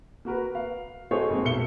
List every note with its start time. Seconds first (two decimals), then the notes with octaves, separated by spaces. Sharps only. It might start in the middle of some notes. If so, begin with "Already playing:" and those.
0.25 A#3 F#4 A#4 B4
0.55 F5
1.11 A3 D#4 F#4 G#4 C5 C#5
1.30 F2 G#3 A#3
1.45 B1 E5 C#7 G7